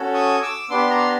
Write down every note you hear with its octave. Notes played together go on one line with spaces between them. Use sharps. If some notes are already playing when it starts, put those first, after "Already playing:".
Already playing: C#4 F#4 A4
C#6 D#6
D6 E6
B3 D4 G4 C6 D6
A#5 C6